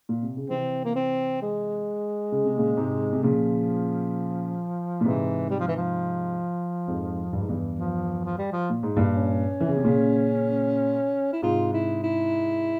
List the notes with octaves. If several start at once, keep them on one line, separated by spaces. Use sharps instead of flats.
A#2
C3
C#3
C3 E3 C4
A#3
C4
G#3
C#3
C3
A#2 C#3
G#2 C3
C3
A#2 C#3 F3
A#2
G#2 C3 E3
G3
F3
E3
F3
F2 G#2
G2
G#2
E2 G2
F3
F3
G3
F3
A#2
G#2
G2 A#2
C#4
E3
C#3
C3
A#2 C#3
E4
G#2 C3 F4
E4
E4